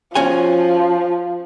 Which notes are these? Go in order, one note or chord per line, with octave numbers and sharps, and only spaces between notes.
F3 C#4 F#4 G#5